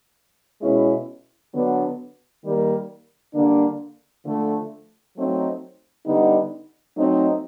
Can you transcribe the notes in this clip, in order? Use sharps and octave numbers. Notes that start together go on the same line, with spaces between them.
B2 G#3 C#4 E4
D3 F#3 B3 D4
D#3 G3 A#3
D3 G3 A#3 D4
D3 F3 A3
F#3 A3 C4 D#4
D3 G3 B3 D#4
F#3 A3 C4 D#4